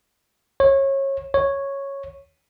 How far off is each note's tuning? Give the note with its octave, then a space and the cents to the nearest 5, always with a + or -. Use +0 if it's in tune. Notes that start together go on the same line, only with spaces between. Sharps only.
C#5 -25
C#5 -5